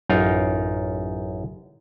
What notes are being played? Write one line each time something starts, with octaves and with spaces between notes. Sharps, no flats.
A1 F#2 D#4 F4 A#4